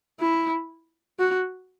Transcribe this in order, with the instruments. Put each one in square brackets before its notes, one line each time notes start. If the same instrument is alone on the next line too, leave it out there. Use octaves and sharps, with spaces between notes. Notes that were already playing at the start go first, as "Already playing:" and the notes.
[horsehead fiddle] E4
F#4